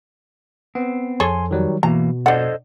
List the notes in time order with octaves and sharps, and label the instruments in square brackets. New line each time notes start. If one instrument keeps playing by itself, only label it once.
[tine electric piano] B3 [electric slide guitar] C4
[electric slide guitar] F2 [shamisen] G#4 A4 C#5 [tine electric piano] G#5 C6
[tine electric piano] D#3 F#3 G3
[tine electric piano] B2 [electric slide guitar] E3 A#3 [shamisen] A#5
[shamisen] D4 F#5 [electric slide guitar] A4 C5 D#5